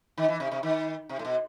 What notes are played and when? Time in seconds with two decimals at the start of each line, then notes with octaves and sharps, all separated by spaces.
0.18 D#3
0.28 E3
0.40 C3
0.52 C3
0.63 D#3
1.09 C3
1.19 A2
1.25 B2